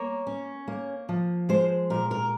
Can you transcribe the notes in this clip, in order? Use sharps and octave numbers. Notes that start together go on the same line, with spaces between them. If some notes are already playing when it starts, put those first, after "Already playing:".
Already playing: A#3 C#5
C#4
A#3
F3
G#3 C5
A#2 A#4
A#4